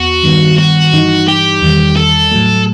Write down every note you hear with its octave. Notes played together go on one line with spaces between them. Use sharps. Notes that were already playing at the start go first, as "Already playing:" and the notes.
Already playing: E2 B3 F#4
G2 D#3 G3 B3
F#4
G2 E3 G3 D#4
G4
E2 D#3 G3
A4
A2 F#3 A3